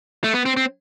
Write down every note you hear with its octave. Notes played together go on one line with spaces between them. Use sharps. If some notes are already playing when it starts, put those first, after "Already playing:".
A3
B3
C4
C4